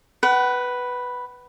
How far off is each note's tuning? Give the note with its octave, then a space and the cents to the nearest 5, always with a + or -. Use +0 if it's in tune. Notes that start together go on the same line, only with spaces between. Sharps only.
B4 +0 F#5 +35